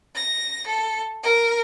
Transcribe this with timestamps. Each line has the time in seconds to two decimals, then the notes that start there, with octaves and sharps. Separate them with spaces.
0.15 A#6
0.65 A4
1.22 A#4